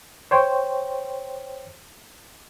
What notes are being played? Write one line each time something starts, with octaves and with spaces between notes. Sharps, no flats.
C5 C#5 G5